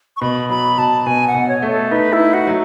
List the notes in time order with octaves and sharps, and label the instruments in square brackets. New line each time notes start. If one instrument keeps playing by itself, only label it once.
[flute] C#6
[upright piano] B2 [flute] B5
[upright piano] F#3 [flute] B5
[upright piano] B2 [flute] A5
[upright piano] B2 [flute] G#5
[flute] F#5
[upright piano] B2
[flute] C#5
[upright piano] A3
[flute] A4
[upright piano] D#4 [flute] B4
[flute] E4
[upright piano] D#4
[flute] F#4
[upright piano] F#3